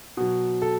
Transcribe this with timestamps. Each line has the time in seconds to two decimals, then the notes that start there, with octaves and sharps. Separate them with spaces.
0.17 B2 F#3
0.62 A4